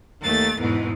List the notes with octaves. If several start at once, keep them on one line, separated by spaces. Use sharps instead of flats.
D#2 A3 A6
E2 G#2 B2